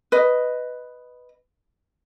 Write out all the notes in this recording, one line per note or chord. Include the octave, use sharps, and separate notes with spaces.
B4 D#5